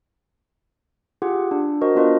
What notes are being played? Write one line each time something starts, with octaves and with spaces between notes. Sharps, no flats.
F4 G4 G#4 F#5
D4
F#4 A#4 C5 D#5
B3 D4 F4 B4 D#5